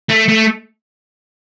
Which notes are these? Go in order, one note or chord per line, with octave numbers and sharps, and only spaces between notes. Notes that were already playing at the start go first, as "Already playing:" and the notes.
A3
A3